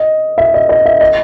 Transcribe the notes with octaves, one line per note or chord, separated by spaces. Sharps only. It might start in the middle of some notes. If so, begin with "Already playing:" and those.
Already playing: D#5
E5
D#5
D#5
E5
D#5